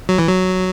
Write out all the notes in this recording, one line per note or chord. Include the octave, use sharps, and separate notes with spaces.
F#3
E3
F#3